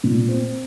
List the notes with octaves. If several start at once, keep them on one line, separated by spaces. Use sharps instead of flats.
A#2
C4